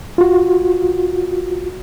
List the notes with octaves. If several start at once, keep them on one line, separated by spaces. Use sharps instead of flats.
F4 F#4